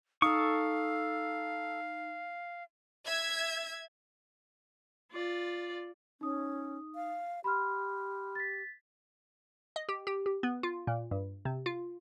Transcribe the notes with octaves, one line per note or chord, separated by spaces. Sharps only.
D#4 A4 F5 C#6 D#6
E5 G#6
F4 D5
C#4 D#4 D#6
F5
G4 B5 C6 F6
A6 B6
D#5
G4
G4
G4
B3
F4
A#2
G2
C3
F4